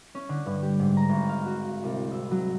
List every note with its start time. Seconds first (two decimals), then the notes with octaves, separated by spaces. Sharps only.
0.15 C#4
0.29 D3
0.46 G2
0.62 G4
0.80 G#2
0.97 A#5
1.09 G#1
1.29 F5
1.45 F#4
1.83 C2
2.12 E6
2.31 F#3